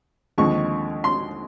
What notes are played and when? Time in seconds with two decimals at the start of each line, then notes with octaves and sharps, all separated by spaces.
0.38 D#2 D3 F3 G#3 C4 C#6
1.04 C6